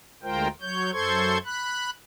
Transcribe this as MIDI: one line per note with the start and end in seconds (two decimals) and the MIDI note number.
0.23 0.48 38
0.23 0.48 56
0.23 0.48 65
0.23 0.48 70
0.23 0.48 72
0.23 0.48 79
0.61 0.91 54
0.61 0.91 73
0.61 0.91 91
0.92 1.38 42
0.92 1.38 69
0.92 1.38 72
0.92 1.38 84
0.92 1.38 85
0.92 1.38 92
1.45 1.90 83
1.45 1.90 90